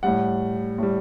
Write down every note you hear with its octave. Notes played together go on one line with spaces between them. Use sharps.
A2 G3 F#5
A2 G3